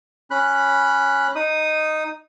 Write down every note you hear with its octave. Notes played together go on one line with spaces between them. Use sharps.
C#4 B5 F#6
D#4 D#6